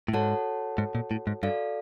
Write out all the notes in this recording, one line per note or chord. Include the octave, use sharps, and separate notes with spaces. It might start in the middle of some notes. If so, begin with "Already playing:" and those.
A2
G#2 F#4 A4 C#5 F#5 A5
G#2
A#2
A2
G#2
G2 F#4 A4 D5 F5